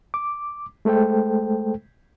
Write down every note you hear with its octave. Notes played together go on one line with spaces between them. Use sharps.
D6
G#3 A3 A4 C5 G5